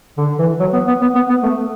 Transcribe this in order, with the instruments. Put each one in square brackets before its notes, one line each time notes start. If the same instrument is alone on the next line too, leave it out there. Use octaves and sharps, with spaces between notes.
[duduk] D3
E3
F#3
B3
B3
B3
B3
B3
A3